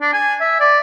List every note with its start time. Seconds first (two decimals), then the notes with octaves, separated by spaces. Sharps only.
0.01 D4
0.13 G#5
0.41 E5
0.60 D5